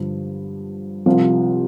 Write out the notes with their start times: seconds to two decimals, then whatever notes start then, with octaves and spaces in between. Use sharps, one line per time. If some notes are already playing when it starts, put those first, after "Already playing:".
Already playing: G2 D3 F3
1.06 C2 C3 F3